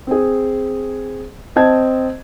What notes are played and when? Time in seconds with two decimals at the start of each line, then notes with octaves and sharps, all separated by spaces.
0.07 C4 G#4
1.56 C4 D#5 A5 G#6